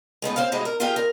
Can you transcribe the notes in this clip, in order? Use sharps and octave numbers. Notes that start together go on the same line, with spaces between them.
G#3 A3 B3 D#4
C4 C5 C#5 F5
A2 C3 G#3 D#4 E4 F#4
A#4
F4 G4 G#4 A#4 F5 G5
A#4